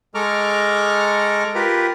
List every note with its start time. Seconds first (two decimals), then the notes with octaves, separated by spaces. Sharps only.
0.15 G#3 A4 A#5 C#6 D6 F6
1.55 F4 G4 A#4 B4